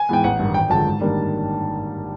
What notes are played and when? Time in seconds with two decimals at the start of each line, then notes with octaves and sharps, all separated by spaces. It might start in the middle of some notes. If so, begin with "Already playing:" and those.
Already playing: G#5
0.09 G#2 E3 G#3 B3 G5
0.24 A1 F#5
0.39 G2 D#3
0.54 G#1 G5
0.70 F#2 D3 F3 G#3 A5
0.86 G#2
1.01 D#3 G3 A#3 D4